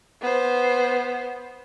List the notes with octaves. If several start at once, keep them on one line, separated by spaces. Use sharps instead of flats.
B3 C5